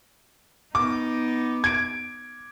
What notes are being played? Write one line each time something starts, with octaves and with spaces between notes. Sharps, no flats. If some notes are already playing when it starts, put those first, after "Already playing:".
B3 D#4 D6
G#6 D7